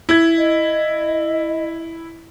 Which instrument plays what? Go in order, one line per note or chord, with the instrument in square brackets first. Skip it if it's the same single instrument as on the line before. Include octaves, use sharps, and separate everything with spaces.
[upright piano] E4 G#6
[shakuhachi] D#5